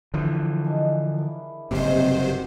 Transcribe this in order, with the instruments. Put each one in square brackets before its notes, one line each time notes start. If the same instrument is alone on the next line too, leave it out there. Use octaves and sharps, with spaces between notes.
[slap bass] D3 E3 F3
[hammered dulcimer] D4 G#4 D#5
E4 A#4
[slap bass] F#1 G2 [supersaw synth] C3 C5 [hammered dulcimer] C4 D#4 F#4